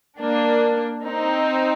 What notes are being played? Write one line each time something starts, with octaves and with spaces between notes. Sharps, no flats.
A#3 D4
C4 D#4